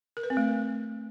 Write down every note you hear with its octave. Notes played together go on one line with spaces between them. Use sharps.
A#4
B4
C4
A3